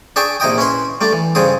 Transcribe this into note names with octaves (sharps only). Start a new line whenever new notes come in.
D4 G#4 E5 G5 C#6
A#1 C3 E4 D#5 G5 D#6
C#4 E4 B4 C6
G3 A3 D4
E3
G2 C#3 C4 G#4 D#6